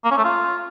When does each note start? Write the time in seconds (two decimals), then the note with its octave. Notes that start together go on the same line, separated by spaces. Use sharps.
0.05 A#3
0.11 C#4
0.18 A3
0.25 F4